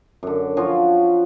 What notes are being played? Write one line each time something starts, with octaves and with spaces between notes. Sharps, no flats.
F#2 D3
F3 C#4 F4 F#4